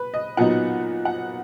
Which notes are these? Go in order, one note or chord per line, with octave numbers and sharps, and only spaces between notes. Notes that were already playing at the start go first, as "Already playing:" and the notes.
Already playing: B4
D#5
A#2 F#3 B3 D#4 F#5
F#5